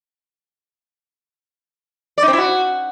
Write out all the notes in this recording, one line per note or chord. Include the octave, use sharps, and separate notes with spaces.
D5
D#4
C4
E4
F#4